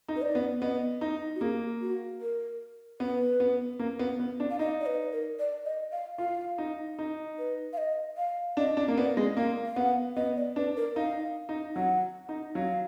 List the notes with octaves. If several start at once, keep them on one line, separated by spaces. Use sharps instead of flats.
D#4
B4
D5
B3
B3 D#5
D#4
F#4
A#3 G#4
F#4
A#4
B3 B4
B3
A#3
B3
B3
D4
F5
D#4 D#5
D5
B4
A#4
D5
D#5
F5
F4 F5
D#4
D#4
B4
F5
D#5
F5
D4 D#5
D4
A#3
B3 D5
G#3
A#3 F5
F5
B3 F#5
B3 D#5
D5
D4 B4
A#4
D#4 F5
D#4
F#3 F#5
D#4
F#3 F5